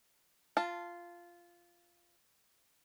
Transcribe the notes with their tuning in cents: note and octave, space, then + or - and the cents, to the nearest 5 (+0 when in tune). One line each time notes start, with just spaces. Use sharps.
F4 -10 A5 +0